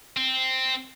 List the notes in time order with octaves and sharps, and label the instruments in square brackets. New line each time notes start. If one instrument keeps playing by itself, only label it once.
[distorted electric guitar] C4